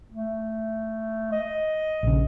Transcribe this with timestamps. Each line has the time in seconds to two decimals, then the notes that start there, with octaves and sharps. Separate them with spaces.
0.11 A3
1.32 D#5
2.03 A#1 C#3